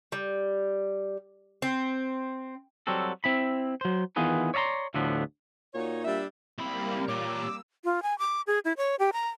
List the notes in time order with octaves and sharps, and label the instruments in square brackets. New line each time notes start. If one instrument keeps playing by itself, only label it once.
[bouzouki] G3
C4
[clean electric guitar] F#3 G3 C4 F#4 A4
C4 E4 B5
F#3 C5
D#3 E3 B3 F4 G#4 B4
C#5 D5 E5 A#5 C6
D2 A2 D3 F3 B3
[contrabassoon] A#2 [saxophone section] D#4 F#4 C#5
[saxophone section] G3 D4 E5
[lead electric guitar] C#2 B5 [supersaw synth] G3 A#3 [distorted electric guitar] C4 E4
[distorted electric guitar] A#2 [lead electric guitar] G4 C#5 [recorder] D6 [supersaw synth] E6
[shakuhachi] F4
G#5
D6
G#4
E4
C#5
G4
A#5